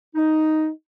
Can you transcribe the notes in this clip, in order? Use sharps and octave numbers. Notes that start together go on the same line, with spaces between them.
D#4